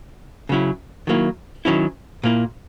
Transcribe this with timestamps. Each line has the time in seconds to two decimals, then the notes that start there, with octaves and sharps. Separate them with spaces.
0.49 C#3 F#3 C#4 E4
1.07 D#3 F#3 A#3 E4
1.65 D#3 F#3 C#4 E4
2.23 A#2 A#3 E4